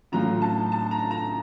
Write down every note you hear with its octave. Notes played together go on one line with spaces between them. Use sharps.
A2 F#3 A3 C#4 F4 A#5
A5
A5
A#5
A#5